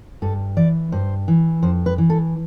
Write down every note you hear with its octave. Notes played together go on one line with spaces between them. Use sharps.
G2 A4
E3 D5
G2 C5
E3
F2 C5
B4
E3
A4